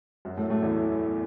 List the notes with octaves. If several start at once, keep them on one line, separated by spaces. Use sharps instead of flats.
F#2 F#3
A2 A3
A2 A3
E2 E3